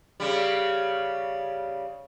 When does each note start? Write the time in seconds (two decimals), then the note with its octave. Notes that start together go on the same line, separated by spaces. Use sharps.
0.20 C#3 G3